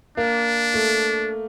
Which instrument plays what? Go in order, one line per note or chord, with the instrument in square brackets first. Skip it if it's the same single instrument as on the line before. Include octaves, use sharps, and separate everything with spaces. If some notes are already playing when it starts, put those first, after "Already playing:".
[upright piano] A#3 [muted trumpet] D4
[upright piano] A3